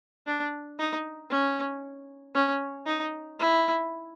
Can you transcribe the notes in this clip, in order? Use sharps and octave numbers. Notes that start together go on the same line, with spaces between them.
D4
D#4
C#4
C#4
D#4
E4